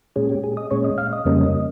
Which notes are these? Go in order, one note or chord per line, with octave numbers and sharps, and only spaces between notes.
A#2 G#3 C#4 G#4
G4
G#4
D#5
A#2 G#3 C#4 C#5
D#5
F5
D#5
F2 C#3 G3 A#3 C#4